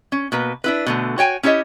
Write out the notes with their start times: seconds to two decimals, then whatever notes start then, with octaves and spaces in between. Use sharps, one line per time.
0.12 C#4
0.32 B2 A#3 B4
0.64 D4 E4 B4
0.86 B2 D3 A3
1.18 F#4 C#5 G5 G#5
1.43 C#4 E4 G4 C#5 D#5